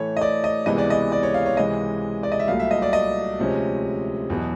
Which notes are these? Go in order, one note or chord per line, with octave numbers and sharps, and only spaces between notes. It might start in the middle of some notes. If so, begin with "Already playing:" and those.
Already playing: A2 E3 A3 C#5
D#5
D5
D#5
C#2 C3 E3 G#3 B3 D#5
D5
D#5
D5
C#5
F5
C#5
C#2 C3 E3 G#3 D#5
D5
D#5
E5
C2 A#2 F#3 A3 F5
E5
D#5
D5
D#5
D2 C3 F3 G#3 C#4
E2 B2 F#3